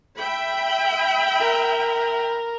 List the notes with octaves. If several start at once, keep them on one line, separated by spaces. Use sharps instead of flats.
E5 G5 B5
A#4